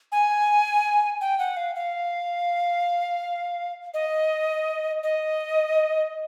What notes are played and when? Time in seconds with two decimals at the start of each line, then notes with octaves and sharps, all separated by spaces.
0.12 G#5
1.21 G5
1.39 F#5
1.57 F5
1.75 F5
3.94 D#5
5.03 D#5